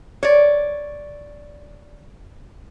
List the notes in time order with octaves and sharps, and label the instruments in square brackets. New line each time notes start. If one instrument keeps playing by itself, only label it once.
[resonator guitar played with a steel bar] C#5 D5